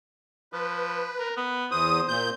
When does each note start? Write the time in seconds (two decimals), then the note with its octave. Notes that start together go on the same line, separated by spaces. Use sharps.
0.53 F3 B4
1.19 A#4
1.37 B3
1.72 E2 C5 D#6
2.08 A#2 G6